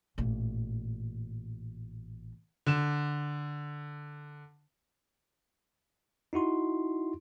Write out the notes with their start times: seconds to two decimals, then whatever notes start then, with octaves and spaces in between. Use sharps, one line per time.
0.18 A1 A#2
2.66 D3 E7
6.33 D#4 E4 F#4 C6